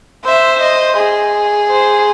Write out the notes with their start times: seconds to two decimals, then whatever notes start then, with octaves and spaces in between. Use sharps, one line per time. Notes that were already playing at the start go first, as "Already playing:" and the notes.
0.25 C5 E5
0.60 D#5
0.97 G#4
1.69 C5